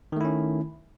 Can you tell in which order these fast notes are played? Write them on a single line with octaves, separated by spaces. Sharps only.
D#3 A3 E4 C#4